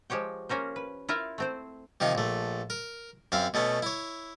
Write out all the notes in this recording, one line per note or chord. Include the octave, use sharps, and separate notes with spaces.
F3 G#3 G4 C#5 G5
A#3 C#4 A#4 C5
B4
E4 F4 A#4 E5 F5
A3 C4 C5
C3 D#3 F3 D#4
A#1 A3
A#4
F#2 C4 E5 F5
B2 A3 B3 C#4
E4 C#5